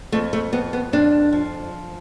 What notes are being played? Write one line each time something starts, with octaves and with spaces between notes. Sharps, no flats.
F2 A3
A3
F2 B3
B3
F2 D4
F3